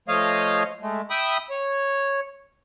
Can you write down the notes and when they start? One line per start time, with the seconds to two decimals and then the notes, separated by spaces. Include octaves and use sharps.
0.08 F3 A3 C#5 D#5 F5
0.82 G#3 A3
1.10 E5 G5 B5 D#6
1.50 C#5